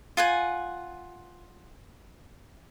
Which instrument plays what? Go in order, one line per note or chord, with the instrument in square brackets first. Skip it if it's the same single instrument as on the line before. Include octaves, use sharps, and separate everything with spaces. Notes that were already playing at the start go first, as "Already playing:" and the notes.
[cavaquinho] F4 F#5 G#5